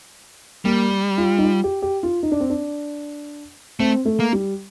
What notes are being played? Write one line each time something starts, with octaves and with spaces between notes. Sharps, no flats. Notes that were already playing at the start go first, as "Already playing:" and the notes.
G3 A#3
F4
D#4
F4
G4
G4
F4
D#4
D4
C4
D4
A3 C4
A3
A#3
G3